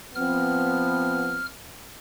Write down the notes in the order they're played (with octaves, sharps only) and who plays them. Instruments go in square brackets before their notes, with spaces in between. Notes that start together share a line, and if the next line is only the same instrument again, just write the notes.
[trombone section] F3 B3 [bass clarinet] C4 [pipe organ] F6